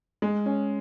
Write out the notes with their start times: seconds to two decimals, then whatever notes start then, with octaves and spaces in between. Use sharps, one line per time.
0.22 G#3
0.46 C#4